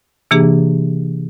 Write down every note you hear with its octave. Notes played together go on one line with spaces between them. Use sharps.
C3 E3 A#3 D4 G4 G#4